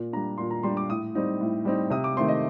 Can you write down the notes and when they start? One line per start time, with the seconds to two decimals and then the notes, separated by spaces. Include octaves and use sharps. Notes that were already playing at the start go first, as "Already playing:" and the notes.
Already playing: A#2
0.13 G3 D4 A#5
0.38 A#2 C6
0.51 A#5
0.63 G3 D4 C6
0.77 D6
0.89 A2 D#6
1.15 G3 C4 D#4
1.41 A2
1.65 G3 C4 D#4
1.90 C3 D#6
2.04 D6
2.17 D#3 A3 C4 C6
2.29 D#5